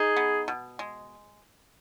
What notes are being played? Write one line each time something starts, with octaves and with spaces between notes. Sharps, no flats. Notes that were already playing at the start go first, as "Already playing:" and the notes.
Already playing: D#4 G#4
B3
B2
G#3